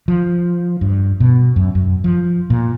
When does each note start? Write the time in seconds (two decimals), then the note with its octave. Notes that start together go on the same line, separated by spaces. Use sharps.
0.08 F3
0.81 G2
1.20 B2
1.56 F#2
1.75 F#2
2.04 F3
2.50 A#2